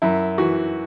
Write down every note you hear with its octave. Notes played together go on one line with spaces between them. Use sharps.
F#2 E4
E3 F#4